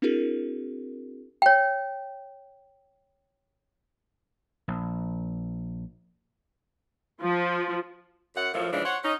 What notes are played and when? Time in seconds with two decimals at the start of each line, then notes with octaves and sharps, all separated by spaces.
0.02 C4 D4 E4 F#4 G#4 A#4
1.42 C#5 G5
4.68 A#1
7.21 F3
8.35 F#2 F#5
8.53 F#2 A2 F3
8.71 C#3 E3 F3 G#3 D4
8.84 C5 C#5 F#5
9.03 C#4 D#4